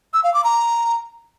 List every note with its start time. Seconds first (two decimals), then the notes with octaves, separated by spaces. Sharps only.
0.13 E6
0.24 F5
0.34 D6
0.44 A#5